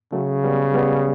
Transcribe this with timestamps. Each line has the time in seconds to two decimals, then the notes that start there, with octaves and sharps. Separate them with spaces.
0.12 C#3 F#3 A3
0.44 G3 B3
0.74 G3 B3